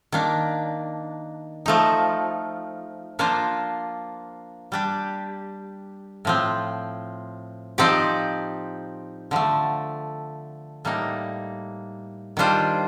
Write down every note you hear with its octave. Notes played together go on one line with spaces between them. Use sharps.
D#3 A#3 D4
F3 A3 D#4
F3 A#3 D4 F4 C5
G3 D4 G4
A2 F3 C4
F3 C4 D#4 G4 D5
D3 F3 A3
A2 G3 A#3 D#4
D#3 G3 D4 F4 C5